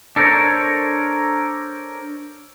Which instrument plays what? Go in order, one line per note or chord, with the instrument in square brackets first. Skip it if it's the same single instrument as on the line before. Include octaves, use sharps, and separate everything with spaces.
[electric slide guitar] D4 A4 A#4 C5 C#5